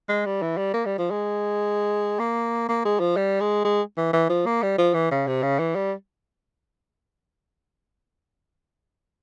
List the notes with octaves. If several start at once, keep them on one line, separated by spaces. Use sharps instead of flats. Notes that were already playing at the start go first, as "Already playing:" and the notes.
G#3
G3
E3
G3
A#3
G3
F3
G#3
A#3
A#3
G#3
F3
G3
G#3
G#3
E3
E3
F3
A#3
G3
F3
E3
C#3
C3
C#3
E3
G3